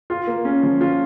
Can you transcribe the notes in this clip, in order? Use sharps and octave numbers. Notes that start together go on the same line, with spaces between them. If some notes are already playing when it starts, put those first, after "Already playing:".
F4
A#3
C#4
F3
F4